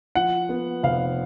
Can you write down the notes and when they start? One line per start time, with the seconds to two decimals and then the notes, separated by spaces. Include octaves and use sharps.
0.15 F3 F#5
0.49 B3
0.83 F1 F5